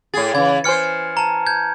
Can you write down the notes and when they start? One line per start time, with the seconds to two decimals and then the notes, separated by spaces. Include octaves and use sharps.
0.14 A2 G#4 A6
0.35 C#3 E3 G#6
0.64 E3 C5 G#5 F6 C#7
1.17 A5 A#5
1.46 G6 G#6